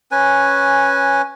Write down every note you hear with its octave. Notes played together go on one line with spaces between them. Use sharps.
C#4 B4 G#5